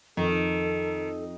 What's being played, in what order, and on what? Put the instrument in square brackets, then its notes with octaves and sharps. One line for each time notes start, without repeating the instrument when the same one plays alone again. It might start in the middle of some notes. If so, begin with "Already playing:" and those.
[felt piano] F2 [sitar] D#3 [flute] A4